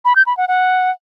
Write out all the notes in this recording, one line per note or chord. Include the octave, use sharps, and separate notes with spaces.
B5
G6
B5
F#5
F#5